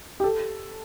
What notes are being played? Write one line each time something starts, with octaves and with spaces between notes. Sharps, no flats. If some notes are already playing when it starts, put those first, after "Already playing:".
G4
A4